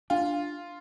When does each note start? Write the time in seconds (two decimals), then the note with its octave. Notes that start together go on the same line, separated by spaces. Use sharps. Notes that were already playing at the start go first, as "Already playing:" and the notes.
0.10 D4 F4